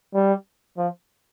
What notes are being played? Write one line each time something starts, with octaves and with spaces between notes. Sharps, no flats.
G3
F3